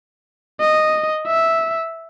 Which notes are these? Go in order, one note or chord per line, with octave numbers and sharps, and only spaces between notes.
D#5
E5